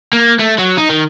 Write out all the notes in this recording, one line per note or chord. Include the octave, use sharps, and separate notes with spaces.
A#3
A3
F#3
D#4
D#3